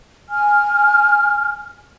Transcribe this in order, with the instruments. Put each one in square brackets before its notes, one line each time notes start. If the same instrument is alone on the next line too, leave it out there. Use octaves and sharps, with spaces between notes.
[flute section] G#5 F6